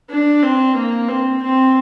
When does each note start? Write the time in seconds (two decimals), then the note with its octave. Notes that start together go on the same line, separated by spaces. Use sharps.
0.10 D4
0.43 C4
0.76 A#3
1.09 C4
1.42 C4